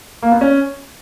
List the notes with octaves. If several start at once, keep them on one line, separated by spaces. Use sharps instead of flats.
A#3
B3
C#4